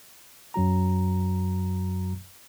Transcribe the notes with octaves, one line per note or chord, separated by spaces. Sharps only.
F#2 F#3 F#4 A#5